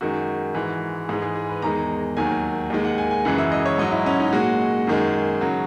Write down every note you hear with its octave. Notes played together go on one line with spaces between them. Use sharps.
F#2 D#3 G#3 F#4
G#2 E3 G#3
G#2 E3 G#3 G#4
G#4
G#4
B4
E2 D#3 G#3 A#5
D#2 D#3 F#3 G#5
D#2 D#3 G#3
F#5
G#5
G#5
F#2 C#3 E3 G#3 F#5
E5
D#5
C#5
G#2 F#3 D#5
E4
C#4
D#4
A#2 G#3 F#4
F#2 D#3 G#3
C#3 F#3